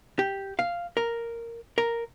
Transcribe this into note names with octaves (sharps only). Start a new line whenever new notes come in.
G4
F5
A#4
A#4